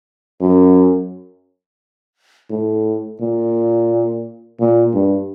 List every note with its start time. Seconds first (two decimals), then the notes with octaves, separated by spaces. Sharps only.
0.41 F#2
2.50 A2
3.21 A#2
4.60 A#2
4.94 G2